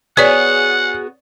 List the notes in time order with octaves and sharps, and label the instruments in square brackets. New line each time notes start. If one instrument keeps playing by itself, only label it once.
[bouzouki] B3 F#4 G#4 [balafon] B4 D5 [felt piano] C#5 [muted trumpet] F#5